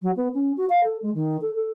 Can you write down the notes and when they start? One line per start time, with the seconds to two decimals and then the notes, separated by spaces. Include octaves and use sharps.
0.02 F#3
0.16 B3
0.34 C#4
0.57 F#4
0.69 F5
0.83 A4
1.02 G#3
1.14 D#3
1.41 A4
1.55 A4